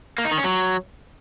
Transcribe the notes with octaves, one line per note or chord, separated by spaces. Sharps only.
A#3
D#4
D#3
C#4
F#3